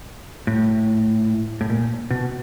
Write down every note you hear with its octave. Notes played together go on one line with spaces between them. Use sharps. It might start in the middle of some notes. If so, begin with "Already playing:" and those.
A2
A2
A#2
B2